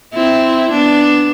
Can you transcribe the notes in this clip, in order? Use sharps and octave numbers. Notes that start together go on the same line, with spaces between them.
C4 E4
B3 D4